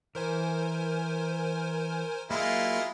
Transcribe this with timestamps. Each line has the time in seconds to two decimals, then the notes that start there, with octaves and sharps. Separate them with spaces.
0.15 E3 A#4 C5 G#5
2.30 F#3 G#3 A#3 E4 F4